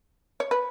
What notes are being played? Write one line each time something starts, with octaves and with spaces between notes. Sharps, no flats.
C#5
B4